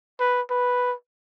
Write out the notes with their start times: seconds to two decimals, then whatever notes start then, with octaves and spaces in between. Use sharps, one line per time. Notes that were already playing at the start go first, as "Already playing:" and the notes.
0.20 B4
0.50 B4